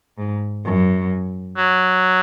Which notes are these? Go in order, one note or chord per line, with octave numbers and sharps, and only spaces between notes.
G#2
F#2
F#3